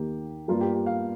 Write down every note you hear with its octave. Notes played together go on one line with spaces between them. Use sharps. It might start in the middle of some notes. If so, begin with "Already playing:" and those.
Already playing: D#2 D#3 A#3 G4
G2 G3 A#3 F4
G4
G4
F5